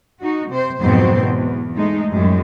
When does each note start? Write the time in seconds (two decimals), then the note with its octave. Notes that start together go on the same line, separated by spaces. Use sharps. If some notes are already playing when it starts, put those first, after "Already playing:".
0.21 D#4 F#4
0.49 C3 C5
0.80 F2 G#2 B2 F#3 C4 C5
1.20 E2
1.77 G#3 A3 D#4
2.12 F#2 A2 G3 G#3